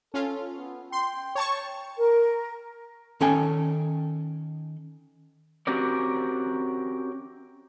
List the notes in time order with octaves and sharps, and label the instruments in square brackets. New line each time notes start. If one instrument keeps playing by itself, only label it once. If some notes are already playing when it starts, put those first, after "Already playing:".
[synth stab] C#4 F4 [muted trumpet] A4
[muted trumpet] B3
[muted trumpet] G5 [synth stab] C6
[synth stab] C#5 A5 C#6
[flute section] A#4
[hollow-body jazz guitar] D#3 C#4 A4 G5 G#5
[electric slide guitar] C4 C#4 F#4 G4 A#4 D5